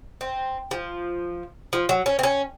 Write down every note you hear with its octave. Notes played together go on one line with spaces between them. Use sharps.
C4
F3
F3
F#3
C#4
C4
C#4